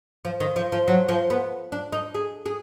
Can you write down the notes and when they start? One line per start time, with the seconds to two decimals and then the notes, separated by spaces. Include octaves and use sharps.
0.25 F3
0.40 D#3
0.56 F3
0.72 F3
0.88 F#3
1.09 F3
1.30 B3
1.72 D4
1.92 D#4
2.14 G#4
2.46 G#4